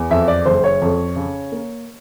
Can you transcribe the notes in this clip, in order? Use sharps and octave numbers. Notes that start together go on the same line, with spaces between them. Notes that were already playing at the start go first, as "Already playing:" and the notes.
Already playing: E2
F2 E5
D5
F#1 C5
C#5
F2
C#3
A#3